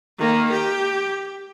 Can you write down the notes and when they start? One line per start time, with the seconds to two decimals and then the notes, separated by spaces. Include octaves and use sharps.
0.18 D#3 A#3
0.51 G4